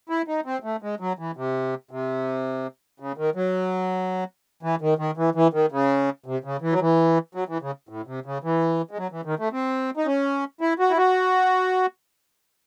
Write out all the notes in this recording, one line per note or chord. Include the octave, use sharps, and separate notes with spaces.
E4
D#4
C4
A3
G#3
F#3
E3
C3
C3
C#3
D#3
F#3
E3
D#3
D#3
E3
E3
D#3
C#3
C3
C#3
E3
F#3
E3
F#3
E3
C#3
A2
C3
C#3
E3
G#3
F#3
E3
D#3
A3
C4
D#4
C#4
E4
F#4
E4
F#4